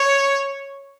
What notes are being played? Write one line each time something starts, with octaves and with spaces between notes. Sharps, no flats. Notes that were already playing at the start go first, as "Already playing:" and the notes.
Already playing: C#5